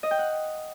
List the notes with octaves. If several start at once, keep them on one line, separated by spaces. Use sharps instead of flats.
D#5
G5
F#5